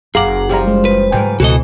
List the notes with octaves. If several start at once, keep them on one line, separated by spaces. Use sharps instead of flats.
F#1 G#4 F5 F#5 A#5 D6
F3 G3 F4 G4 A#5
G#3
B4
G#2 C#3 G3 A3 A#4 G5
C#2 B2 E3 F#4 A4 D#5